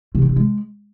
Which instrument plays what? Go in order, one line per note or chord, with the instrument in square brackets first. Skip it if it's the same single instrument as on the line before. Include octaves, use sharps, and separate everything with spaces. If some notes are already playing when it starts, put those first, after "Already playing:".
[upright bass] C3
C4
C3
G#3